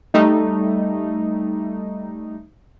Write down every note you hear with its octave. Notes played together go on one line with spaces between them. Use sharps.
G3 A3 D#4